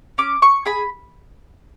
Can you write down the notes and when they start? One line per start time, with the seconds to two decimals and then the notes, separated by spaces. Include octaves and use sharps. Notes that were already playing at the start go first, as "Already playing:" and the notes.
0.18 C#4 D6
0.42 C#6
0.66 G#4 B5